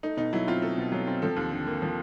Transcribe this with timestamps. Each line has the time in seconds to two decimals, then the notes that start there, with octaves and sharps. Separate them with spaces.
0.03 A3 D#4
0.17 B2 D#4
0.33 F#3 E4
0.48 C4 F4
0.62 A3 A4
0.78 B2
0.92 F#3
1.07 C4
1.22 F3 A4
1.36 D#2
1.52 D3
1.67 A#3
1.82 F3